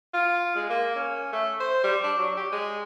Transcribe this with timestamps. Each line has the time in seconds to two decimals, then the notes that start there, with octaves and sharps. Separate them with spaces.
0.13 F4
0.55 G#3
0.70 A#3
0.96 C#4
1.32 A3
1.60 C5
1.84 G3
2.04 D4
2.18 F#3
2.37 G4
2.52 G#3